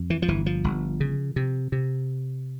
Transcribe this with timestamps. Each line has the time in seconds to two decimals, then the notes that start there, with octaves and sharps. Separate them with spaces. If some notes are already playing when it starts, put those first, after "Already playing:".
Already playing: F2
0.10 E3
0.22 F3
0.28 G1 E3
0.46 F3
0.64 G1
1.00 C#3
1.36 C3
1.72 C3